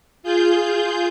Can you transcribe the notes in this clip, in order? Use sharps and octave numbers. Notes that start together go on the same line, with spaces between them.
F4 G#4 G6